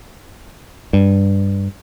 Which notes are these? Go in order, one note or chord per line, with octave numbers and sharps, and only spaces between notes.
G2